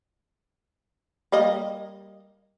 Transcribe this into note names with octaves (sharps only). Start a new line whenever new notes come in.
G3 A#3 D#5